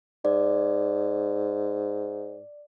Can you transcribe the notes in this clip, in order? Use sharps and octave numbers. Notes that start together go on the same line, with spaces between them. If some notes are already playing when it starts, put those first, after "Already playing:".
G#2 D5